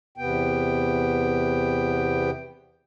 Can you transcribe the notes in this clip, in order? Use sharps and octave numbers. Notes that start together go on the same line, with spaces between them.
E2 C3 B3 G5